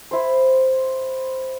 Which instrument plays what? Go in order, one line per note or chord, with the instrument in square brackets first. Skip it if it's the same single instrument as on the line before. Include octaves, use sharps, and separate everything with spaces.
[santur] E4 C5